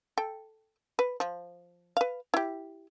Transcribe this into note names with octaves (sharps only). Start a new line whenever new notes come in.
A4 G5
B4
F3
B4 F5
E4 G4